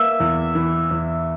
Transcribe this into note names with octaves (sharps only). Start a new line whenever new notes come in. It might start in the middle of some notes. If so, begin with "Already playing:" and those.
Already playing: A#3 E5
E2
E3
E2